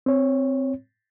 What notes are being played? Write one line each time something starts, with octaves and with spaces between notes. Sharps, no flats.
C4 C#5